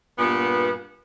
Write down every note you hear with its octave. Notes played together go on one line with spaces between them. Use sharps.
G2 A#2 B3